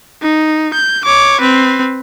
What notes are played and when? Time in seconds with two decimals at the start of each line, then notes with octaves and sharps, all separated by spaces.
0.22 D#4
0.74 G6
1.05 C#5 D6
1.41 C4 B4